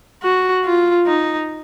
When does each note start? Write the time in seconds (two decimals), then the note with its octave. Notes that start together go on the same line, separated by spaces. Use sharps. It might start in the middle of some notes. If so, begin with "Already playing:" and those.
0.23 F#4
0.65 F4
1.07 D#4